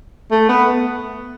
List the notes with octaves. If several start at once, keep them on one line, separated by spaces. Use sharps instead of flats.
A3
B3